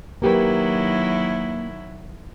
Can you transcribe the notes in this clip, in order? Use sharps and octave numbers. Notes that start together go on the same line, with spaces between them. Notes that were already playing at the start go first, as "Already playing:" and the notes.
D#3 F#3 A#3 E4 G4 B4